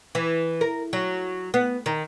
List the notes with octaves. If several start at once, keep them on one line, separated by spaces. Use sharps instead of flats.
E3
A#4
F#3
B3
D#3